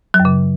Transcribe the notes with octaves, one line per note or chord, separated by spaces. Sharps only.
F#3
F#2
C#3